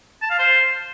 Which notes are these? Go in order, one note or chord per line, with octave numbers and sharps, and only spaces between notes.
A5
F5
C5